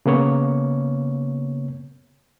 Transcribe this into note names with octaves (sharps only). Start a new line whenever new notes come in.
C#3 A#3 B3 C#5